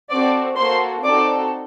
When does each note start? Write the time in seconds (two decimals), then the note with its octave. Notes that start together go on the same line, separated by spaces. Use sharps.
0.10 C4 F#4 A4 D5 D6
0.56 A#3 F#4 A4 C5 C6
1.03 C4 D#4 F#4 A4 D5 D6